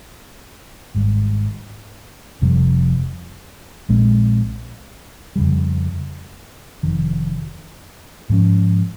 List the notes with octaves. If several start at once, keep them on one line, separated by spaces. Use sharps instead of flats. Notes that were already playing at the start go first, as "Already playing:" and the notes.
G#1 G#2 G3
F1 F2 C3 G3
A#1 A#2 G#3 C4
F2 C#3 G3
F1 F2 D#3
G#2 F3 A#3 C#4